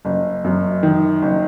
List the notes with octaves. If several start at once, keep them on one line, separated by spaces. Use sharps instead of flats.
F#1
F#2
D#3
F#1